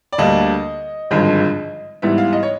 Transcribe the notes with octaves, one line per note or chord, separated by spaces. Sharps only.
D5
D2 D3 G3 A#3 D4 D#5
G#1 G2 D3 F3 G#3
G#2 E3 G3 B3 E5
F5
D#5
C#5